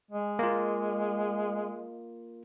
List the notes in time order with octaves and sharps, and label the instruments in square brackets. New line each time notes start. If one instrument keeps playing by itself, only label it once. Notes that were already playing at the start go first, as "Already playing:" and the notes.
[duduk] G#3
[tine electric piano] A#3 F4